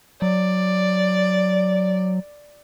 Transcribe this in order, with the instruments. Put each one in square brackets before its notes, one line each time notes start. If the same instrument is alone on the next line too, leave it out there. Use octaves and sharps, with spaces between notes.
[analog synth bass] F#3 [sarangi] D5